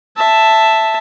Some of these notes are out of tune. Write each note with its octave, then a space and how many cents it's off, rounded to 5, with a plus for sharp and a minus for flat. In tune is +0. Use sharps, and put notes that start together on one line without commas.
E5 +0 A5 +0